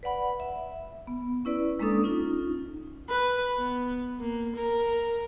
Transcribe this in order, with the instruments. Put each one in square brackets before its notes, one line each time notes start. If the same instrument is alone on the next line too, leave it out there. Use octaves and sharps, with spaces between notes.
[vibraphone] B4 D5 F#5 B5
E5
B3
C#4 E4 B4 D5
G#3 A#3 C#4 D4 A4 D#6
C#4 D#4 F4
[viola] B4
B3
A#3
A#4